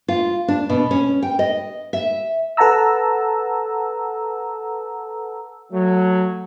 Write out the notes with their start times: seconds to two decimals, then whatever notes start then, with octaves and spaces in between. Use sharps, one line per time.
0.08 F4
0.48 D4
0.69 B2
0.91 C#4
1.22 G5
1.39 D#5
1.93 E5
2.57 A4 B4 F#5 A5 A#5 E6
5.72 F#3 A3